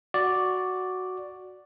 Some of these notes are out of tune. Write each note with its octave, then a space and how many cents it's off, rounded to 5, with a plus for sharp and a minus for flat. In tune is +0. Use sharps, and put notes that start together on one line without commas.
F#4 +0 D5 +0